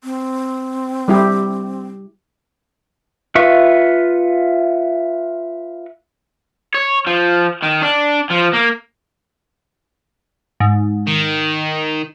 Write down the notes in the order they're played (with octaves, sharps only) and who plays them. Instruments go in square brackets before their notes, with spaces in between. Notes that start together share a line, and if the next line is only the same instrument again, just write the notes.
[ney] C4
[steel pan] G3 E4 G4
[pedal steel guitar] F4 B4 E5 C#6
[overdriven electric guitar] C#5
F3
D#3
D4
F3
A#3
[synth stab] G#2
[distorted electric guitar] D#3